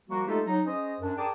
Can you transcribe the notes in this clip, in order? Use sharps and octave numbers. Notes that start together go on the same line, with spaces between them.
F3 G3 A#3 F#4
G#3 A3 D#4 F4 G4 A4
F#3 D#4
C#4 G#4 C5 D#5
F#2 D4
G#4 A#4 D5 G5 A5